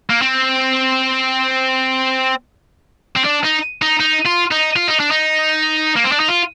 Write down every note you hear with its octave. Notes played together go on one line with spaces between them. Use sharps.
A#3
C4
C4
D4
D#4
D#4
D#4
F4
D#4
F4
D#4
D4
D#4
A#3
C4
D4
D#4
F4